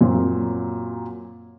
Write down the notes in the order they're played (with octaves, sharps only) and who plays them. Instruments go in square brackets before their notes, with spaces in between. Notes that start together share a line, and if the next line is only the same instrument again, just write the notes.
[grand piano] F#2 A#2 C4